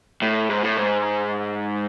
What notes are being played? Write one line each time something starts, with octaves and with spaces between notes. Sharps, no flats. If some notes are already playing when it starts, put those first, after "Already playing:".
A2
G#2
A2
G#2